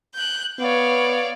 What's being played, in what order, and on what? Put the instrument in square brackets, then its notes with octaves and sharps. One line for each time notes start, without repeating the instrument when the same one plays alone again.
[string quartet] F#6 G6
[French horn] B3 [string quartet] C#5 D5 F5